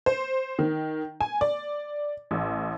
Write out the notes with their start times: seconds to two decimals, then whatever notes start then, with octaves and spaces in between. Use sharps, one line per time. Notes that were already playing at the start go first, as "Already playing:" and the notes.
0.06 C5
0.59 D#3
1.21 G#5
1.41 D5
2.31 A1